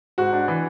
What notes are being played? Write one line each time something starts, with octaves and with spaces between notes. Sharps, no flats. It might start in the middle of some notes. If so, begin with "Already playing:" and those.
G#2 F#4
D4
E3